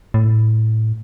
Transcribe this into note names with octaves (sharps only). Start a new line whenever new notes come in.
A2